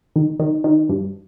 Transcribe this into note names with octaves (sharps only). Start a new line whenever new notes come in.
D#3
D#3
D#3
G2